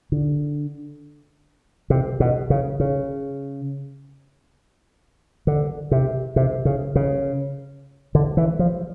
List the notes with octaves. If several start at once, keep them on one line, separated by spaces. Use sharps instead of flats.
D3
C3
B2
C#3
C#3
D3
C3
C3
C#3
C#3
D3
E3
F3